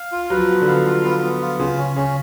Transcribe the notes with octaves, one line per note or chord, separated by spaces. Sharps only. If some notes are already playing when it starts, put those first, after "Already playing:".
Already playing: F5
F4
F#3 B4
F3
B3
D3
F5
F4
B3
B3
F4
C#3 F4
C#4
C#3 C#4